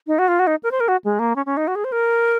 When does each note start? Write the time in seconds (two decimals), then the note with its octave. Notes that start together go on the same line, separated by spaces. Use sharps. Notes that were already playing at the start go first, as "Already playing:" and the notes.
0.07 D#4
0.19 F#4
0.28 F4
0.39 F#4
0.47 D#4
0.63 A#4
0.71 C5
0.80 A#4
0.88 F#4
1.04 G#3
1.19 A#3
1.36 C#4
1.46 C#4
1.57 D#4
1.68 F#4
1.75 G#4
1.84 C5
1.92 A#4